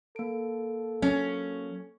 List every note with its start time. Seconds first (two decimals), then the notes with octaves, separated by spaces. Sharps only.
0.16 A#3 A4 D7
1.02 F#3 C#4